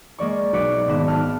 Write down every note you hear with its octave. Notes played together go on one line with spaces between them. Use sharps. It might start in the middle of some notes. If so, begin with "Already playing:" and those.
G#3 A#3 D5 C#6
B1 F#4 B4 D6 C#7 D7
G#1 A#3 B3 E7
A5 F6 F#6